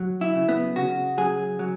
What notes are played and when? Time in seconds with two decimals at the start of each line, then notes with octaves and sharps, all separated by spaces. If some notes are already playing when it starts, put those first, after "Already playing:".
Already playing: F#3
0.21 E4
0.35 C#3
0.49 B3
0.76 C#3 F#4
1.18 F#3 G#4
1.59 F#3